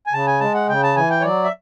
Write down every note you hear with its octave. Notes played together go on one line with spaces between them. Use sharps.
G#5
C#3 A5
G#5
G#3 A5
F#5
C#3 G5
A5
E3 G#5
G5
C#5
F#3 D5
E5